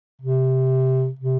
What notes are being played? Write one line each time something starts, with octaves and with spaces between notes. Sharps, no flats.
C3
C3